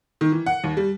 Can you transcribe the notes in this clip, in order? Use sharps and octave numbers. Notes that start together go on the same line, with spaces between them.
D#3
E3
F#5
D#2
G3